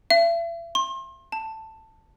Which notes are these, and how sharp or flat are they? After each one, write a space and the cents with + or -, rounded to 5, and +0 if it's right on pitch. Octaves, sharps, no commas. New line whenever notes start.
E5 +40
C6 +35
A5 +10